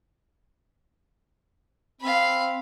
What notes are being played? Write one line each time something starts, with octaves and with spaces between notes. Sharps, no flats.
C4 F5 B5